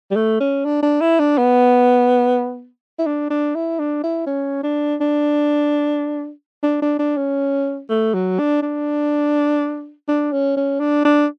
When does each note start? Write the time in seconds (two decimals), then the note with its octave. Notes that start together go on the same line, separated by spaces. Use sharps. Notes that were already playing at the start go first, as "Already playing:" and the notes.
0.11 G3
0.16 A3
0.40 C#4
0.65 D4
0.83 D4
1.01 E4
1.19 D4
1.38 B3
2.99 E4
3.06 D4
3.30 D4
3.55 E4
3.79 D4
4.03 E4
4.27 C#4
4.63 D4
5.01 D4
6.63 D4
6.82 D4
6.99 D4
7.17 C#4
7.90 A3
8.14 F#3
8.39 D4
8.62 D4
10.08 D4
10.32 C#4
10.56 C#4
10.80 D4
11.05 D4